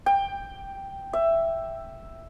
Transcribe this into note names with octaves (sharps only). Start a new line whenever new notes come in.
G5
E5